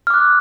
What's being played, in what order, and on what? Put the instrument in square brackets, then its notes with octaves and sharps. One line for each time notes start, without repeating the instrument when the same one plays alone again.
[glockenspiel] F6
D6
F#6